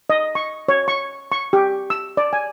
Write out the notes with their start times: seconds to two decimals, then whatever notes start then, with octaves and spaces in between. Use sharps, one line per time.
0.10 D#5
0.35 C#6
0.69 C#5
0.88 C#6
1.32 C#6
1.53 G4
1.90 E6
2.17 D5
2.33 G#5